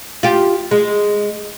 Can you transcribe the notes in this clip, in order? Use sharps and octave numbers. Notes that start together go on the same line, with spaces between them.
F4 G4
G#3